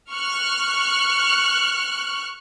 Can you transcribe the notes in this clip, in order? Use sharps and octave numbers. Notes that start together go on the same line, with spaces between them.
C#6 F6 F#6